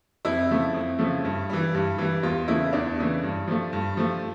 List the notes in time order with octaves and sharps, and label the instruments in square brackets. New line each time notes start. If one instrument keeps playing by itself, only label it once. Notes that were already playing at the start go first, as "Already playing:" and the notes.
[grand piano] F2 E4
C#3 F3 A3
F2
C#3 F3 A3
G2
E3 G3
G2
E3 G3
E2 F4
C#3 E3 A3 E4
E2 D4
C#3 E3 A3
G2
F3 A3
G2
F3 A3